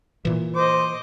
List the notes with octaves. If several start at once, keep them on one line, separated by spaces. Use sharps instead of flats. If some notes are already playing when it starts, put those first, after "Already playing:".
A#2 E3
C5 D#5 D6